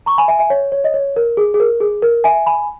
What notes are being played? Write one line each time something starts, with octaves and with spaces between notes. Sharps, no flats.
A#5 C#6
G#5 B5
E5 G#5
E5 G#5
C#5
C#5
D#5
C#5
A#4
G#4
G#4
A#4
G#4
A#4
E5 G#5
G#5 B5